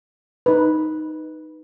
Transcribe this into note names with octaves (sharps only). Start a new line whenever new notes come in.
D#4 B4